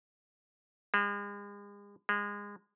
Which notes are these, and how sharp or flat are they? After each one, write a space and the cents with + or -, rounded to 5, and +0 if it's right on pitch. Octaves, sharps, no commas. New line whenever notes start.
G#3 -40
G#3 -25